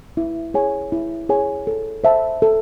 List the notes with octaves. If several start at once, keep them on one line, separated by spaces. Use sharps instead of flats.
E4
G#4 C#5 G#5
E4
G#4 C#5 G#5
A4
C5 E5 A5
A4